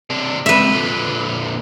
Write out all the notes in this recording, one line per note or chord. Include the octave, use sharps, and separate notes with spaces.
C3 D4
C#2 C3 B4 E5
A#2 D3